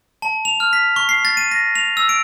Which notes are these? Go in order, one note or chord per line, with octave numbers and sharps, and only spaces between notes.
A5
F7
F6
B6
C#6
C7
A6
D#7
A#6
F7
E6
D7